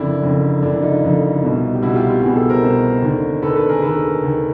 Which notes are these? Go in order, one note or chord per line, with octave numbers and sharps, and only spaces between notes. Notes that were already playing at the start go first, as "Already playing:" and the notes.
Already playing: F#1 F2 D3 D4 E4
F#1 F2 D3
F#1 F2 D3 D4 E4
D#4 F4
F#1 F2 D3
C2 B2
G4
C2 B2 E4 F#4
F4 G4
F4 G4
C2 B2 F#4 G#4
G4 A4
A#4 C5
C2 B2
D#2 D3
D#2 D3 A4 B4
A4 B4
G#4 A#4
D#2 D3 A4 B4
D#2 D3